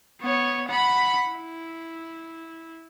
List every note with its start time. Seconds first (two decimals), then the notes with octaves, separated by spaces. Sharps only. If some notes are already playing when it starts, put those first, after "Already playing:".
0.21 B3 C#5
0.68 F#5 B5
1.29 E4